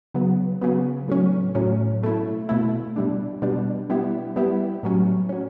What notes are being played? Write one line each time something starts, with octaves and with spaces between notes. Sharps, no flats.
C#3 F#3 B3
C#3 F#3 B3
A2 F#3 C#4
A2 F#3 C#4
B2 A3 E4
B2 A3 E4
B2 G3 D4
B2 G3 D4
G3 B3 E4 G4
G3 B3 E4 G4
A2 F#3 C#4
F#3 C#4